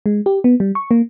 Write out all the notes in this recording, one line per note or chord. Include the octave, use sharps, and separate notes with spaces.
G#3
G4
B3
G3
C#6
A#3